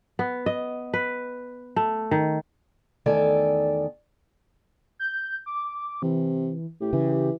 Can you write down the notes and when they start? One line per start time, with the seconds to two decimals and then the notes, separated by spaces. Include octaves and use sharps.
0.19 B3
0.46 D#5
0.93 B4
1.76 A3
2.11 D#3
3.06 E2 D#3 A3 A4 D5 G#5
4.99 G6
5.46 D6
6.03 C3 E3
6.81 A2 G4
6.93 C#3 E3